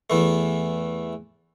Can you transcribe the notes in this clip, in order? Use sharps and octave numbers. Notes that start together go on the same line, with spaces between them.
E2 E3 A3